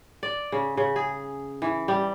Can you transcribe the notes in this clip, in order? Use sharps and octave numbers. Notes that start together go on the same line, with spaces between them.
D5
C#3
C#3
G#4
E3
G3